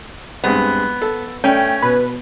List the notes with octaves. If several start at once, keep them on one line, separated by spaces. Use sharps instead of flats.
G2 G#3 B3 C4
A4
A3 C#4 G5
B2 B4